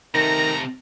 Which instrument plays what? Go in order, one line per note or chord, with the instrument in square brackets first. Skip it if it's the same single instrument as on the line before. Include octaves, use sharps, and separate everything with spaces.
[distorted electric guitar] C3 A3 [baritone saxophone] D#3 [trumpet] A#5 [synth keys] A#6